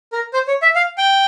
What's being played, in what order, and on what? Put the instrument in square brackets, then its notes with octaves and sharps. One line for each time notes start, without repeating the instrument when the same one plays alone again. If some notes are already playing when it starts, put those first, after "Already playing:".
[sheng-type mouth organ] A#4
C5
C#5
E5
F5
G5